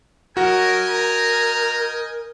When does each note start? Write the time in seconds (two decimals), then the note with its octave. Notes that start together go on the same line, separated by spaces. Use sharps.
0.37 F#3 F#4 A#4 D#5 G5 G#5
0.89 A#4 A#5